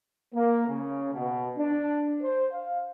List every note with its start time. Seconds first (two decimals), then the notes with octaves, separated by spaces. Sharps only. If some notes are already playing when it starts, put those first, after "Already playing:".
0.34 A#3
0.69 C#3
1.14 B2
1.58 D4
2.21 C5
2.52 F5